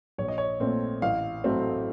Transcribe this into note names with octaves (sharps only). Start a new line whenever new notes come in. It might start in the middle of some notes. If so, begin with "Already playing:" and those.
A#1 C#5
D#5
C#5
A#2 A3 C4
A1 F5
A2 F#3 A3 C4